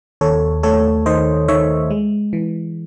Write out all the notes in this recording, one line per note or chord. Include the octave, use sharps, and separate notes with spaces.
D#2 A4 C#5
A3 A4 C#5
D#3 C5 D#5
D#3 C#5 E5
G#3
E3